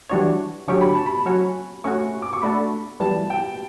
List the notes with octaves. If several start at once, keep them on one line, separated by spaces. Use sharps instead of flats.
E3 G3 D4 F#4 C#5 C#6
D3 F#3 C#4 G4 C#6
B5
A5
B5
F#3 C#4 F#4 C#5
A3 C#4 F#4 C#6
D6
C#6
A3 D4 F#4 A4 B5
E3 G3 B3 A5
G5